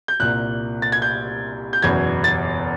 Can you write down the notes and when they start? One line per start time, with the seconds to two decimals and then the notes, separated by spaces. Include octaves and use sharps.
0.08 G6
0.20 C2 A#2 F#6
0.82 A6
0.92 G#6
1.02 G6
1.73 G6
1.83 F#1 E2 B2 G#6
2.24 A6